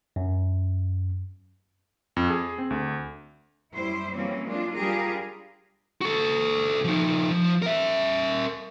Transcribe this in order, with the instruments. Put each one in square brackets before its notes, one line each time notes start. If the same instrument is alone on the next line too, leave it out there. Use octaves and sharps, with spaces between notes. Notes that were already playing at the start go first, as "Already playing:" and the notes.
[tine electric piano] F#2
[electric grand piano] F2
G#4
C4
D2
[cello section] F#2 G3 E4 C5
E3 F#3 G3 A#3 C4 C#4
G#3 A#3 D4 F4
G3 D4 F4 G4 G#4 A#4
[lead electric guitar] F#4 A4
F3 D#4
F3
A#4 E5